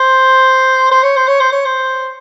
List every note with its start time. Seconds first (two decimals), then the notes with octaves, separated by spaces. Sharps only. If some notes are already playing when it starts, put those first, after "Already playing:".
Already playing: C5
0.91 C5
1.03 C#5
1.16 C5
1.27 C#5
1.40 C5
1.52 C#5
1.65 C5